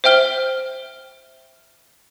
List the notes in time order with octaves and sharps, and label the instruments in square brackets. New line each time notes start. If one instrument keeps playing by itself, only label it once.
[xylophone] C5 E5 G5 F6 G7